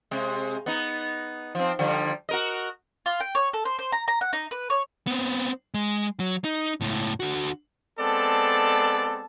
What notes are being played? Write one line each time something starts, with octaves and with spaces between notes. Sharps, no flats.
C3 G#3
B3 D#4
F3 C4
D3 F3 G3
F#4 A#4 D#5
F4
G5
C#5
A4
C5
C5
A#5
A#5
F#5
D#4
B4
C#5
B3 C4
G#3
F#3
D#4
C#2 A2
D3 F#4
G#3 B3 C4 A4 D5 A5